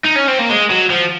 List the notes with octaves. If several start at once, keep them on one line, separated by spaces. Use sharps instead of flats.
D#4
C#4
C4
A#3
G#3
F#3
F3